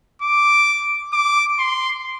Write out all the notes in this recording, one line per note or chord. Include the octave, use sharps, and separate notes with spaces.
D6
D6
C6